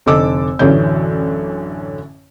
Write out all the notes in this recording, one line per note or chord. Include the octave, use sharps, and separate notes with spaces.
F1 D3 D#4 A4 D6 E6
A1 F#2 D3 E3 C#4 G6